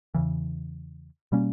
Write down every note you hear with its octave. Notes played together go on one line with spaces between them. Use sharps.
E2 C#3 E3
B2 G3 A#3 C#4